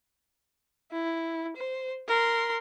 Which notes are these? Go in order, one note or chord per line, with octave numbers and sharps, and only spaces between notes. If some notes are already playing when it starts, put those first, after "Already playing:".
E4
C5
A#4 C6